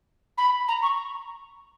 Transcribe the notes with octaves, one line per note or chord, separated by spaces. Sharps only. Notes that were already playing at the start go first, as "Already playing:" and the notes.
B5
A#5
C#6